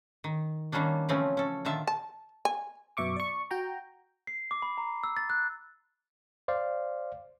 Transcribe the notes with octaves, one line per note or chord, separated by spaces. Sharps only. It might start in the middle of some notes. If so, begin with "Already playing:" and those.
D#3
D#3 G3 A#3 C#4 D4
C#3 E3 F3 A3 C4 C#4
C#4 A4
A#2 D3 D#3 F4 E5 A5
A5
G#5
F#2 B2 E5 C#6 D6
D5 C#6
F#4 G5 A#5
C7
D6
B5
A#5
E6
A6
F#6
C5 D5 F5